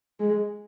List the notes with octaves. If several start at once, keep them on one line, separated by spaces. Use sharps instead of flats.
G#3